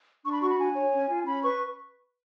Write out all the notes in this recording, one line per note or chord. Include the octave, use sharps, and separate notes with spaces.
D4 C#6
B5
F#4 C#6
B5
D4 G#5
C#5
C#4
F4
C#4 B5
B4 C#6